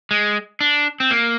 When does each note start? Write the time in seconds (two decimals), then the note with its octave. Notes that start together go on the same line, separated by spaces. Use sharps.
0.11 G#3
0.61 D4
1.00 C4
1.11 A#3